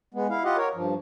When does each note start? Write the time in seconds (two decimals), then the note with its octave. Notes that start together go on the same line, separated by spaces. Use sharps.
0.14 G#3 B3
0.30 E4 F5
0.44 F4 G4 D#5 F#5
0.57 A#4 C#5
0.75 G2 F3